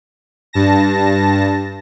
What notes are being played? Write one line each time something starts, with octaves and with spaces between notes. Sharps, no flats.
G2 A5 A#6